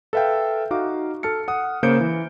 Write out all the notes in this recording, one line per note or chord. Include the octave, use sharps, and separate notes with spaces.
A4 B4 E5 F5 G5
D#4 F#4 F5 D6
A4 A5 F6 C#7
F#5 D#6
C#3 A#3 C5 G6 C#7 D7
E3